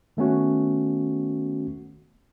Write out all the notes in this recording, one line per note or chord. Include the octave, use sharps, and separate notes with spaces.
D#3 A3 B3 C#4 F#4